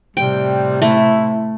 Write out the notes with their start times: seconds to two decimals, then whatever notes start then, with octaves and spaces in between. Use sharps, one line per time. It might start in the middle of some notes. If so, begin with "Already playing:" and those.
0.17 A2 C3 G3 G5
0.82 A3 E4